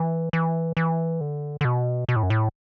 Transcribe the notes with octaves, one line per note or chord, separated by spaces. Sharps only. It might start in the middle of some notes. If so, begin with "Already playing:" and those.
Already playing: E3
E3
E3
D3
D3
B2
B2
A2
F#2
A2